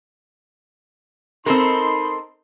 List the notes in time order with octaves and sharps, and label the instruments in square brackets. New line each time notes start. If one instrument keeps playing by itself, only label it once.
[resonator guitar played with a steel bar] C4 A4 A#4 [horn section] D#4 C6 [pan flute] B5